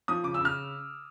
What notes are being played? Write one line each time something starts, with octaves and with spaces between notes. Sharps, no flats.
F3 D#6
C#3 D6
E6
C#3 F6